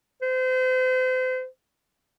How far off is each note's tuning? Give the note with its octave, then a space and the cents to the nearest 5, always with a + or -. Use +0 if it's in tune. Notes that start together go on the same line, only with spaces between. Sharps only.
C5 -35